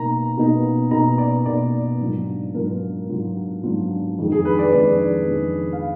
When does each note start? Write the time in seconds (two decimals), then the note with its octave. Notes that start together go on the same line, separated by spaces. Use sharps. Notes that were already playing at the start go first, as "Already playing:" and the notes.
Already playing: B2 A#3 D#4 A#5
0.37 B2 A#3 D#4
0.91 B2 A#3 D#4 A#5
1.18 D5
1.45 B2 A#3 D#4 D5
2.00 G#2 F#3 D4 F4
2.54 G#2 F#3 D4 F4 A#4
3.09 G#2 F#3 D4 F4
3.63 G#2 F#3 D4 F4
4.18 F2 D#3 G#3 D4
4.32 G#4
4.45 B4
4.59 D5
4.72 F2 D#3 G#3 D4 D5
5.28 F2 D#3 G#3 D4
5.73 F5